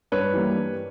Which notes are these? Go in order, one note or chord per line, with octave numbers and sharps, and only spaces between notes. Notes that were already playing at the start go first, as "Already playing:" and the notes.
G2 B4 C#5
E3 G3 A#3
G2